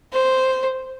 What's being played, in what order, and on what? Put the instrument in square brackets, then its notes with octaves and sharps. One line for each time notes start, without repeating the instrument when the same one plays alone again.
[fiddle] C5